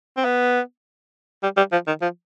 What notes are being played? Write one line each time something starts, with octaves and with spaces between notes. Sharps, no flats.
C4
B3
G3
G3
F3
D#3
F3